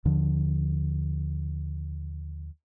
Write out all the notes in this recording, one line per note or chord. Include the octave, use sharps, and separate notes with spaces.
D#2 D3 F3